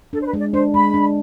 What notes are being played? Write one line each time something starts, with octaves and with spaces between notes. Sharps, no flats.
D4 A4
C5
B4
G#3
D5
D4 C5
G#3 B5
D4